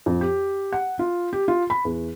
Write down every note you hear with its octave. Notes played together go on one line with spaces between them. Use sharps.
F2
G4
F#5
F4
G4
F4
B5
E2